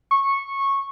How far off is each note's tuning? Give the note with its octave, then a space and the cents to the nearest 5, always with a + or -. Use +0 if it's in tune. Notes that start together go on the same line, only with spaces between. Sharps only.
C#6 -15